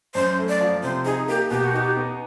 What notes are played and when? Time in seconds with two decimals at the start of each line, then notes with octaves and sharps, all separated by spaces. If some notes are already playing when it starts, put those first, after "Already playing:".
0.14 F#2 C5
0.38 A3
0.49 D5
0.61 F3
0.83 C3 C5
1.05 D#4 G#4
1.28 A#3 G4
1.51 B2 G4
1.64 F#4
1.74 D#4 G4
1.97 B3